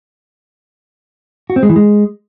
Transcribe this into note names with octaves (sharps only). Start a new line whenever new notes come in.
F#4
C4
G#3
E3
G#3